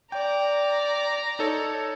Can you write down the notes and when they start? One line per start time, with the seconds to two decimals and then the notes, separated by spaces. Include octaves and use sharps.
0.12 D5 G5 A#5
1.39 D#4 A4 C#5